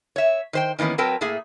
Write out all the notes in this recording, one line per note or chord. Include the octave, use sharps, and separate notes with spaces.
C#5 E5
D#3 C5 G5
D#3 E3 A#3 B3 C#4
F#3 C4 A#4 B4 G5 A5
A2 A3 A#3 G#4